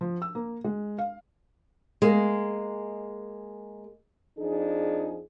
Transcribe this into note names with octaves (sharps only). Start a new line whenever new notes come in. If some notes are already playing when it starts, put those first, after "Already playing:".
F3
E6
A#3
G#3
F5
G#3 A#3
F2 F3 D4 D#4 G#4